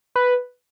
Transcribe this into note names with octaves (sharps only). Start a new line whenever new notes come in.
B4